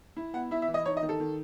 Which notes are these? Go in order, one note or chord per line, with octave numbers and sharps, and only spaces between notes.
E4
B3 F#5
E4 E5
E5
E3
D#5
D#4 C#5
D#5
D#3
A4
D#3